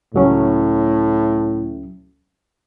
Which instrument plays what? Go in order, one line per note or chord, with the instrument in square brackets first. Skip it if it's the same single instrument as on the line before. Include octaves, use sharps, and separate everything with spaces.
[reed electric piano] C#2 F#3 C#4 [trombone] A2